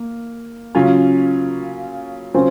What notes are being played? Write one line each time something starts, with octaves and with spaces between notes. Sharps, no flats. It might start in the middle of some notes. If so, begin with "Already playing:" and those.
Already playing: A#3
C#3 F#3 C#4 F4
C#3 F#3 C4 C#4 F4